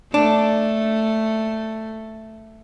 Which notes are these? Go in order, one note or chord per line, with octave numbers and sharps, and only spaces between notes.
A3 D4